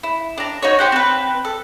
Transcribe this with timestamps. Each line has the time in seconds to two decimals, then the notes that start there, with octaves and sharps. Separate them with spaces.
0.03 E4
0.38 D4 A#5
0.62 D#4 F#4 C#5
0.79 G4 C5 F#5
0.92 C4 B4
1.45 A4